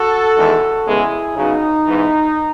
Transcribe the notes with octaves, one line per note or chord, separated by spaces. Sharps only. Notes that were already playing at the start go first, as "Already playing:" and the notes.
Already playing: F#4 A4
E2 D#3 G#3
E2 C#3 G#3 B3 E4 G#4
C#3 F#3 B3 D#4
G#2 E3 B3